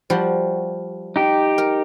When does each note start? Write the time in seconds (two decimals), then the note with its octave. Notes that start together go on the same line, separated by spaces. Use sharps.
0.10 F3 G3 F#4
1.16 D#4 G4
1.58 A#4 A#5